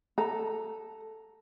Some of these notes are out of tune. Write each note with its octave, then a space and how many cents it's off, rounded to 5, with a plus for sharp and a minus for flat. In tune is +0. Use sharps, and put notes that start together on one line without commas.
A4 +0 A#5 +0